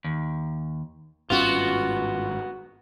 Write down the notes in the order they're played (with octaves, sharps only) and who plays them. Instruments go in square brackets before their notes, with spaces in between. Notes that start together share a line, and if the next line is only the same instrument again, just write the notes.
[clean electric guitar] D#2
[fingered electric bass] G#1 G2 C#4 [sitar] B3 F#4 [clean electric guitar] F4